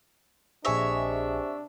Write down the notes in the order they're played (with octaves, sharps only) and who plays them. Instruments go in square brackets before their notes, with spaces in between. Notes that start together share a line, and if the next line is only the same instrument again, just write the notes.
[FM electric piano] A#1 G#4 D#5 [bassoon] C3 [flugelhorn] D4 [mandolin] C#5 E5